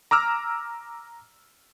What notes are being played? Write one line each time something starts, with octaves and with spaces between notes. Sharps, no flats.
A#5 D6 E6 F6